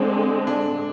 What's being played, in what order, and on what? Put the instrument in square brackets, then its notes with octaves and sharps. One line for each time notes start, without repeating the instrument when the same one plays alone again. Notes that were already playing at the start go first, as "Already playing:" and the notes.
Already playing: [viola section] D3 G#3 C4 [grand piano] D4
[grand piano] D4